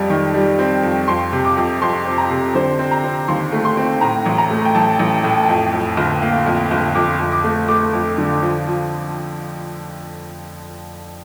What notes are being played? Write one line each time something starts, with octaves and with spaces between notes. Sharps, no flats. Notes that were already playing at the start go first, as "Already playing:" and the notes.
Already playing: F2 G3
D#3
G3
C4
F2
F2 C6
C3
D6
F2
F2 C6
C4
A#5
C3
D3 C5
C4
A#5
C4
D#2 C6
A3
C6
C4
A2 A#5
A1
A#5
A3
G5
A1 A5
A1
A2
F2
F2
G1
A#3
F2
G1
F2 D6
F2
D6
A3
A3 D6
F2
D3
F3
F3